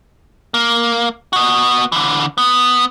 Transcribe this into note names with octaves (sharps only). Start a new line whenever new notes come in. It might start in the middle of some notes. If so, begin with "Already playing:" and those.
A#3
B3 F#4
D3 E3
B3